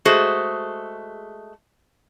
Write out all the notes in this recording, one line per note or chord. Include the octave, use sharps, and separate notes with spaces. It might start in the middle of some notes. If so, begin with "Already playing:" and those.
G#3 A3 F#4 G#4 C5